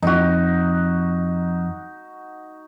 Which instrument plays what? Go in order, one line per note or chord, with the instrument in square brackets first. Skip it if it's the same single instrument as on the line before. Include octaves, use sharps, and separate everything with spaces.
[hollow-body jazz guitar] F2 [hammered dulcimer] D#4 F#4